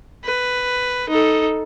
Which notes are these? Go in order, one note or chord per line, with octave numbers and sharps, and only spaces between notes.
B4
D#4 A4